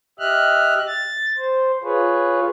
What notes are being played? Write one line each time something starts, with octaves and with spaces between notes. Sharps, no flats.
G4 D#5 E5 F6 F#6
A6
C5
F4 G#4 B4 C#5